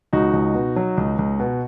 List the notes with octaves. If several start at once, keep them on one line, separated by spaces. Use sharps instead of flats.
C#2 D#4 F#4
C#2
B2
F#3
C#2
C#2
B2